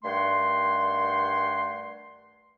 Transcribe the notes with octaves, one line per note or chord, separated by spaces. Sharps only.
G2 D#3 A3 F#5 C6